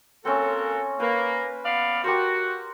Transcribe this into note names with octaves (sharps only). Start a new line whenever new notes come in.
A#3 C4 C#4 F#4 A4
A#3 B4
B3 D5 F5
F#4 G4 A#4 C5